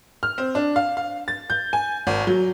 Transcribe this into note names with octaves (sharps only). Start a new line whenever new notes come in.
F6
C4
D4
F5
F5
A6
G6
G#5
G#1
F#3